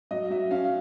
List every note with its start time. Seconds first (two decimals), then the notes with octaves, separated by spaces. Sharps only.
0.11 F#3 D#5
0.31 F#3 E5
0.51 C#4 F5